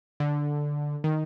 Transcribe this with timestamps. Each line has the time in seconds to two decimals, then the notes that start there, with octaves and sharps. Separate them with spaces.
0.20 D3
1.04 D#3